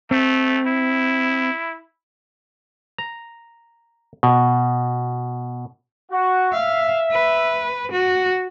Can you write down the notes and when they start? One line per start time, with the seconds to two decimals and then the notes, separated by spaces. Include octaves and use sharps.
0.11 A3 C4
0.67 E4
2.98 A#5
4.23 B2
6.12 F#4
6.53 E5 F5
7.12 B4
7.92 F#4